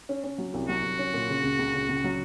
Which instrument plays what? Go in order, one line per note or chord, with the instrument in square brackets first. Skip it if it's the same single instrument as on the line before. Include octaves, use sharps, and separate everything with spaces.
[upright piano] C#4
C#4
F#3
C2
[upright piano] F#3 [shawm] F#4
[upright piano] C2
C#4
A#2
C#3
C#2
C#2
C#3
C#2
F#3